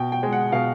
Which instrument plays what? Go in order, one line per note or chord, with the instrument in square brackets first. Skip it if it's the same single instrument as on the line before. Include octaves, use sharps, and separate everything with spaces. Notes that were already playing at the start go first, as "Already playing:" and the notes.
Already playing: [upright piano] B2 G5
G5
G#3
F#5
B2 F5